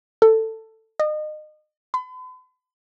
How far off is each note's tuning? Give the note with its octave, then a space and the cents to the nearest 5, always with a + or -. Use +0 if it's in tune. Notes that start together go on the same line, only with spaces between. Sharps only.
A4 +15
D#5 -30
B5 +45